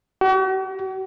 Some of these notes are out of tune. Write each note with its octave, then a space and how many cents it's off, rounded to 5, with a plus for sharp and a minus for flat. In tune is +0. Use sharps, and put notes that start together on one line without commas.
F#4 +45